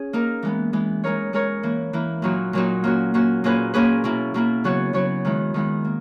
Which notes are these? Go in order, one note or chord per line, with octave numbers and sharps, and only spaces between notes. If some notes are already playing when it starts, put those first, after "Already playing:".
Already playing: C#4 G#4
A#3 D#4 A#4
E3 G#3 B3
E3 G#3 B3
G#3 D#4 A#4 C#5
G#3 D#4 A#4 C#5
E3 A#3 E4
E3 A#3 E4
A#2 F#3 A#3 D#4 F#4
A#2 F#3 A#3 D#4 F#4
A#3 C#4 F#4
A#3 C#4 F#4
A#2 A#3 C#4 G#4 B4
A#2 A#3 C#4 G#4 B4
B2 A#3 E4
B2 A#3 E4
C#3 F#3 B3 F#4 C#5
C#3 F#3 B3 F#4 C#5
D#3 G#3 B3 E4
D#3 G#3 B3 E4
A#3